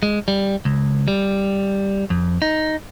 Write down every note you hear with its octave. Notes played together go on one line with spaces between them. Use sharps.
G#3
G3
C#2
G3
F2
D#4